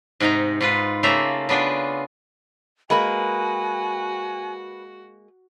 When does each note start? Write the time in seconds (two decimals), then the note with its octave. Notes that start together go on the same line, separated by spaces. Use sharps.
0.20 G#2 C3 D#4 D#5 A#5
0.61 G#2 F4 B4
1.03 C#3 A3 A#3 F4 E5 A#5
1.49 C#3 B3 D4 F4 G5
2.90 G#3 A#3 F#4 B4 G#5 B5